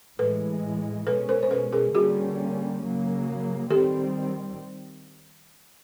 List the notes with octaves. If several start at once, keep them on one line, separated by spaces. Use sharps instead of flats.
A2 E3 G#3 A4 B4
B2 G#3 C#4 A4 B4
A#4 C5
C5
A4 B4
G#4 A#4
D3 G3 A#3 C#4 F#4 G#4
C#3 F#3 A#3
D#3 G3 C4 G4 A4